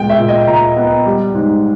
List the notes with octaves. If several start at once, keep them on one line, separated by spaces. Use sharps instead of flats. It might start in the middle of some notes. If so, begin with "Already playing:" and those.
Already playing: A#2 G#3 B3 G5
E5
A#2
D#5
A#2 A#5
B3
G3
G#2